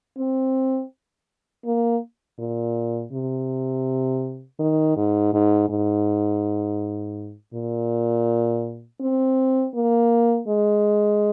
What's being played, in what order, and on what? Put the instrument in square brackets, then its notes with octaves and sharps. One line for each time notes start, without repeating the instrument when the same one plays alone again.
[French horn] C4
A#3
A#2
C3
D#3
G#2
G#2
G#2
A#2
C4
A#3
G#3